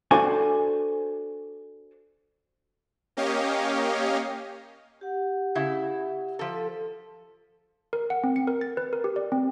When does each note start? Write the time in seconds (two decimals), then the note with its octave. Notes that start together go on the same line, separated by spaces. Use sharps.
0.11 D4 F#4 A4 C5 G#5
3.17 A#3 C#4 G4 C#5 D#5 F5
5.01 G4 F#5
5.55 C#3 E4
6.39 F3 A4
7.93 A#4
8.10 F#5
8.24 C4
8.36 C#7
8.47 A#4
8.61 A6
8.77 B4
8.93 A#4
9.04 G4
9.16 D5
9.32 C4